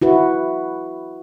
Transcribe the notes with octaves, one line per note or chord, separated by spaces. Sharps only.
E4 F#4 B4